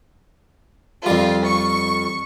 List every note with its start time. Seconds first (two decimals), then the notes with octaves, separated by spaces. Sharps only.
1.06 F2 G3 F4
1.49 C#6